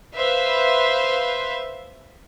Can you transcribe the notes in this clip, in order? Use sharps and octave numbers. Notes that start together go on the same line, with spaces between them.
B4 C5 E5 F5